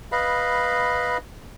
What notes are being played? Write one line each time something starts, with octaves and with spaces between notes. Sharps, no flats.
B4 D#5 F5 B5